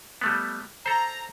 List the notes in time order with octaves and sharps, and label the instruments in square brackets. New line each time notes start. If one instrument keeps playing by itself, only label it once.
[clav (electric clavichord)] G3 A3 B3
[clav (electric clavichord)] A4 C5 [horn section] A#5